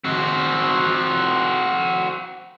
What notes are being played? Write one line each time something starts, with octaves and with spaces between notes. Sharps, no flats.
C4 F#4